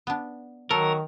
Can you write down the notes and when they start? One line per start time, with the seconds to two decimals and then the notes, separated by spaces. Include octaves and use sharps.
0.07 B3 D4
0.71 D#3 F#3 A4 A#4